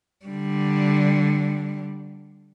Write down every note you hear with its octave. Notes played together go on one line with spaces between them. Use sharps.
D3 G3